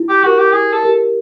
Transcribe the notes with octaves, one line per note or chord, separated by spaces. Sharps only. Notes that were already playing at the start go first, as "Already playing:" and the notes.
Already playing: E4
G4
F#4 G4 A#4
G4
E4 G#4
A4
G4 A#4